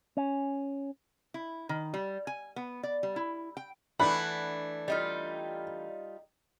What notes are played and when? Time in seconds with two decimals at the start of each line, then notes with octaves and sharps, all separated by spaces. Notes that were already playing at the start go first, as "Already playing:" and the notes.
0.17 C#4
1.34 E4
1.69 D#3
1.94 G3
2.27 G#5
2.56 B3
2.83 D5
3.03 G3
3.16 E4
3.57 G5
4.00 E3 A3 D4 F#5 B5
4.88 G3 D#4 F4